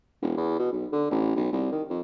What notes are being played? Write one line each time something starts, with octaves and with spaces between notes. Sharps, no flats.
E1
E2
B2
B1
D3
A1
B1
C2
D#3
F2